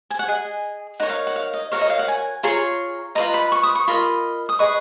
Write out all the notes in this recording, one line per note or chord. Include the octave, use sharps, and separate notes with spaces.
G#5
F#5
G#4 D#5 G#5
D#4 A#4 C#5 F#5
F5
F#5
F5
D#5
F#4 A#4 C#5 F5
D#5
F5
F#5
G#5
F4 G#4 C#5 A#5
F4 B4 D#5 A#5
B5
C#6
D#6
C#6
F4 A#4 D#5 B5
D#6
G#4 B4 D#5 C#6